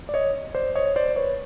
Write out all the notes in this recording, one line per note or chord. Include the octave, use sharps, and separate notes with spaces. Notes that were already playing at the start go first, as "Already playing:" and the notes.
D5
C#5 D#5
C5 D5
C#5 D#5
C5 D5
B4 C#5